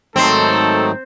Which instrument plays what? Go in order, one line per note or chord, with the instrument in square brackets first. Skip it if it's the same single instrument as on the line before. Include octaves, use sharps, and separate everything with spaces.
[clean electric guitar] G#2 D#3 C6 [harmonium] F#3 A3 D#4 [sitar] C4 [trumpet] A4